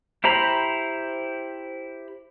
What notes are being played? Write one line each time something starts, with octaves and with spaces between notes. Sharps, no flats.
E4 G4 C5 A#5 B5